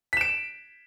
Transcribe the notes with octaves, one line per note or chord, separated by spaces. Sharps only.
B6 D7 E7